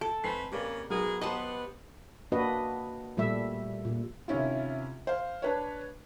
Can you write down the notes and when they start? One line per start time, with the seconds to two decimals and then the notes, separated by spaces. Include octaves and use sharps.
0.01 A4
0.24 F2 A3 B4 C5 G#5 C7
0.52 C#3 A#3 G4 B4 D5
0.90 B1 G#3 B3 F#4 G#4 A#4
1.21 B3 G4 B4 C5 D#5 F#5 A5
2.32 A#3 D4 F#4 B4 D#5
3.17 A#2 G3 A3 E5
3.85 A#2
4.28 C3 D#3 C#4 E4 F4
5.07 C5 F5
5.42 D4 B4 C#5